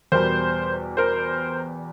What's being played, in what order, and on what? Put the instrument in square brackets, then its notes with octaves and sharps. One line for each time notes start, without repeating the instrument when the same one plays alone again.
[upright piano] E2 B2 G3 A#4 C5
A#4 C5